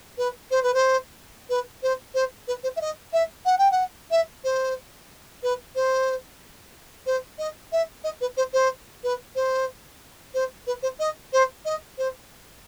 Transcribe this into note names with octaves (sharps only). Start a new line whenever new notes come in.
B4
C5
B4
C5
B4
C5
C5
B4
C5
E5
D#5
E5
F#5
G5
F#5
E5
C5
B4
C5
C5
D#5
E5
D#5
B4
C5
C5
B4
C5
C5
B4
C5
D#5
C5
D#5
C5